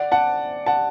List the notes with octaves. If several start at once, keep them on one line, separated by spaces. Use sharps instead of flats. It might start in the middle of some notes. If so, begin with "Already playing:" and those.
Already playing: D5 F#5
F#5 A5
F#5 A5